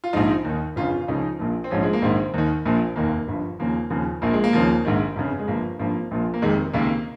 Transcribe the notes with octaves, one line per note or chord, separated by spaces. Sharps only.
F4
A#1 G#2 F3 D#4
D#2 D#3
G1 F2 C#3 F4
F4
C#2 C#3 F3 D#4
A#1 A#2 F3
C4
A#1 G#2 F3 C#4
G#3
A#3
A#1 G#2 D#3 C4
D#2 D#3
A#1 A#2 F3
F1 D#2 D#3 A#3
G1 G2 F3
D#2 C#3 F3 A#3
D#2 C#3 F3
A#1 A#2 F3 A#3
G#3
A#3
D#2 C#3 F3
A#1 G#2 D#3
G1 F2 C#3
G#3
G1 G2 F3 A#3
G#1 G2 F3 A#3
A#1 A#2 F3
A#3
F1 F2 C3 D#3 G#3
C#2 C3 D#3 A#3